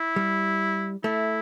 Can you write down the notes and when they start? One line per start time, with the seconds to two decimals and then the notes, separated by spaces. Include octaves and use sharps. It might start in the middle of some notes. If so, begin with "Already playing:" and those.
Already playing: E4
0.16 G3
1.04 A3 E4